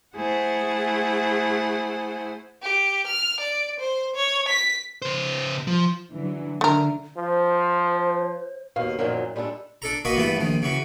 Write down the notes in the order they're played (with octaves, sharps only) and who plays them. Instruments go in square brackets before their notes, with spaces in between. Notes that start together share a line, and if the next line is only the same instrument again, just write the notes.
[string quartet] A3 E4 G#4 C5 F#5
[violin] G4
F6
D5
C5
C#5
B6
[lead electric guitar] C#3 C5
F3
[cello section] D3 E3 F#3
[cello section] D3 [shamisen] A3 A#4
[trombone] F3 [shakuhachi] C5
[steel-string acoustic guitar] D#2 B2 F5
F#2 A#2 D#3 F3 F#3
G3 G#3 D4 F4 A4
[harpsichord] D4 A4 A#5
A#3 F#4 B4 D#5
E2 G2 A3 B4
A#1 D#3
C#3 E3 F#4